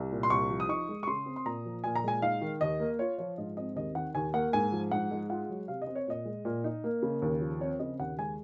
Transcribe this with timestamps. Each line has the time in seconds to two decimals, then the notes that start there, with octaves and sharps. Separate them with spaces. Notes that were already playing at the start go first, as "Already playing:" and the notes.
Already playing: C2
0.12 A#2
0.23 C6
0.30 C2 C#6
0.50 F3
0.60 D#6
0.69 D#4 C#6
0.89 G#3
1.03 C#6
1.07 C#3 C6
1.26 C4
1.36 C6
1.45 A#2 A#5
1.65 F3
1.84 A#2 G#5
1.95 A#5
2.04 G#3 G#5
2.22 D#4 F5
2.41 D#3
2.61 D#2 D#5
2.80 A#3
2.99 F4 C#5
3.18 F3 C#5
3.38 G#2 D#5
3.57 C4 D#5
3.76 D#2 D#5
3.95 D#3 F#5
4.15 D#2 G#5
4.34 A#3 F#5
4.53 G#2 G#5
4.72 F3
4.91 G#2 F#5
5.11 G#3
5.29 F4 F#5
5.49 F#3
5.68 C3 F5
5.82 D#5
5.87 C4
5.95 C#5
6.07 A#2 D#5
6.25 G#3
6.45 A#2
6.64 D#4
6.84 A#3
7.02 C#3
7.22 D#2
7.41 F3
7.60 C4 C#5
7.79 C#3 D#5
7.99 D#2 F#5
8.18 G#3 G#5